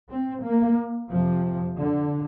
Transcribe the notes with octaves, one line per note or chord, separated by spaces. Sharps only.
C4
A#3
F2 C3 F3
D3